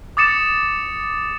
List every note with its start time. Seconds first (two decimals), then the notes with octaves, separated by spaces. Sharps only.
0.17 D6 D#6 A6 C#7 E7